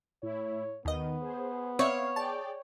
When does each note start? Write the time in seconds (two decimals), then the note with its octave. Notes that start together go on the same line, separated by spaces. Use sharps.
0.23 A2 E4 C#5
0.85 D#2 D#3 B3 D#5
1.21 G#4 C5
1.79 C4 C#5 D5 E5 F5
2.16 G#4 D5 G5 A5